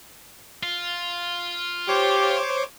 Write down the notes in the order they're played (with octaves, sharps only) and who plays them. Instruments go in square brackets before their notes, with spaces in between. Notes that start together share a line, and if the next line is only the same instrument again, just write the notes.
[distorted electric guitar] F4
[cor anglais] G4 [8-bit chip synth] C5 C#5 D6